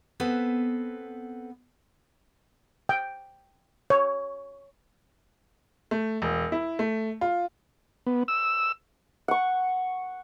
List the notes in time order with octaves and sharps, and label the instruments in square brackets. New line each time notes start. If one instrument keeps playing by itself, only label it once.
[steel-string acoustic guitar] B3 C4 A4 B4
[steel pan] G5
C#5
[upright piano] A3
E1
E4
A3
F4
[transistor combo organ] B3
E6
[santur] F#5 C#6